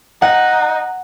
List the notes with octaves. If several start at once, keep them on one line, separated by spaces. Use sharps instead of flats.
D#4 F#5